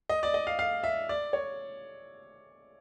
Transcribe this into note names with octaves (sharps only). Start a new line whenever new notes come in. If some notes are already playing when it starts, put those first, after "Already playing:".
D#5
D5
D#5
F5
F5
E5
D5
C#5